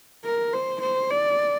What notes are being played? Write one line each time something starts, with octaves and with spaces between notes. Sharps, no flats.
A#4
C5
C5
D5